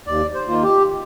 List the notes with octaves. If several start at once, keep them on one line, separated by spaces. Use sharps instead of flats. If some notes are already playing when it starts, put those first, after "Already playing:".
D#2 D5
C5
D#3 A#3 F4
G4